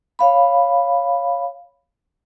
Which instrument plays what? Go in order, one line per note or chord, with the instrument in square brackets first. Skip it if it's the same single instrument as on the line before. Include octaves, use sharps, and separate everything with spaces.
[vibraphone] C#5 F5 B5